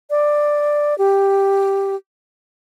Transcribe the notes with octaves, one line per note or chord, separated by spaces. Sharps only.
D5
G4